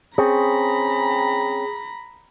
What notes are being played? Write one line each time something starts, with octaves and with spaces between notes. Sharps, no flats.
C4 C#4 G#4 A#5 B5